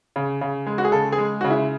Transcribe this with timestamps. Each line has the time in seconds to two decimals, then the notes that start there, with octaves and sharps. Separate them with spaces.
0.16 C#3
0.41 C#3
0.66 G#3
0.78 F#4
0.85 G#4
0.92 C#3 A4
1.12 G#4
1.18 G#3
1.41 C#3 F#4
1.50 E4